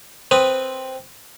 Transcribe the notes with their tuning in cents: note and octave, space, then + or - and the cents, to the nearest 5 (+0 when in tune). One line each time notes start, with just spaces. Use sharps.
C4 +0 B4 +0 D#6 +0